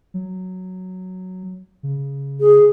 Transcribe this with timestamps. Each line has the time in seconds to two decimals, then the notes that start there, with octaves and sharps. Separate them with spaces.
0.14 F#3
1.83 C#3
2.41 G#4